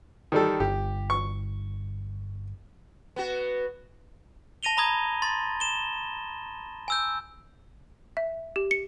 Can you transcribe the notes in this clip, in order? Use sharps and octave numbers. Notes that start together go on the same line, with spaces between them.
D#3 G3 A4
G1 G4
C#6
B3 F#4
A5 A#6 D#7 F7 G7
A#5 B5 D#6 G#6
C6 A6
E7 G7
G#5 E6 G6
E5
G4
C#7